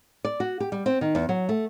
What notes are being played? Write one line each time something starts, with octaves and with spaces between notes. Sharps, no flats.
D5
F#4
G4
G3
C4
D#3
E2
F#3
A3